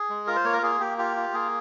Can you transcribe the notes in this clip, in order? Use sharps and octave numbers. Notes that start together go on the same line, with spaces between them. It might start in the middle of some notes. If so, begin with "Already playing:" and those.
Already playing: G#4
G#3
F4 A#4
C5
A#3 C#5
A#4
A#3 G#4
A#3 G4
F4 G4
F4
A#3 G#4